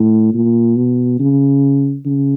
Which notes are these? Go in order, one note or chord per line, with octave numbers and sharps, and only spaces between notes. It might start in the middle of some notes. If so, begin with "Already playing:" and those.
Already playing: A2
A#2
B2
C#3
C#3